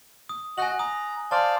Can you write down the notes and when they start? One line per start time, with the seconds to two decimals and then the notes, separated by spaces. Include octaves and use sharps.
0.29 D#6
0.58 F#4 D#5 F#5 G#5 F#6 F#7
0.79 A#5 D#6
1.31 C5 D5 F5 A5